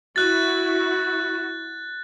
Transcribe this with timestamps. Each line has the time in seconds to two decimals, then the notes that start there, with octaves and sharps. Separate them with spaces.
0.16 E4 F#4 F#6 A6